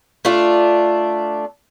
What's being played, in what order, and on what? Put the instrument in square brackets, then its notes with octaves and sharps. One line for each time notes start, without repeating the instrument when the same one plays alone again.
[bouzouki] A3 D4 F4